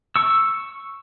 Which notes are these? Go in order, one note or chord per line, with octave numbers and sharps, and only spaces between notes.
C#6 E6